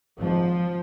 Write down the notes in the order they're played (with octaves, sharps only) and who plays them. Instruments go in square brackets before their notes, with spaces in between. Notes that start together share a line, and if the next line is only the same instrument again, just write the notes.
[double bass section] G#1 G#2 F3